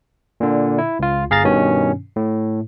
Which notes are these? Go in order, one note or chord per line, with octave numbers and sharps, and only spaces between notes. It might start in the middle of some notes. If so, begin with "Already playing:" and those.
A#2 D3
E4
C#2 F4
G1 G#4 F5 A#5 A6
G2 B2 D#3 C#4
A2